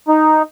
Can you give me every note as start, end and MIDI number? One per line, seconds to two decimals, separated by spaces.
0.08 0.42 63